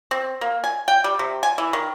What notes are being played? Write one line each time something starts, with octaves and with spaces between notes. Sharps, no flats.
C4
A#3
G#5
G5
G3
C3
G#5
E3
D#3